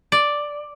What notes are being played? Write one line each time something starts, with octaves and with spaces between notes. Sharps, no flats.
D5